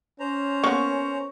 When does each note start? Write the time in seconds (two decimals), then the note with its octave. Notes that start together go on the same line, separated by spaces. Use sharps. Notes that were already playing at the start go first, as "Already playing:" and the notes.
0.20 C#4 C5 A#5
0.64 A#3 B3 C#6